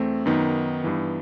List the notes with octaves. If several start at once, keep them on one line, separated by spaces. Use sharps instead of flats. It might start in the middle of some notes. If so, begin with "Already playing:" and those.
Already playing: E2 A3 C4
F#2 D#3 B3 D#4
G2 E3